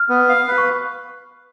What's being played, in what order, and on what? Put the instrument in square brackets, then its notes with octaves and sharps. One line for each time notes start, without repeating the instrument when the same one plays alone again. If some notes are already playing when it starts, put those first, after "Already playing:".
Already playing: [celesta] F6
[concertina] B3
F5
B4
[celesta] C#6